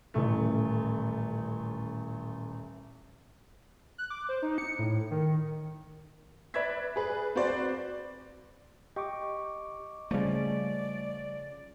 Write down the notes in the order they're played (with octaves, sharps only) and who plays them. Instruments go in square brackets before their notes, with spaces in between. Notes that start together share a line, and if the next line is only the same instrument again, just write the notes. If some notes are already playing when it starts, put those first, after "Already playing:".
[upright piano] D#1 A1 A3
[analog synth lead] F#6
D6
C5
D#4
C#7
A2
D#3
[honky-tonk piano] B4 D5 E5 G#6 B6
G#4 B4
C4 F#4 B4 C5 D5
[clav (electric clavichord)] G4 [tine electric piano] D#5 C#6 D6
[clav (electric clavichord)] C#3 F3 [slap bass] G3 A3 [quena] D5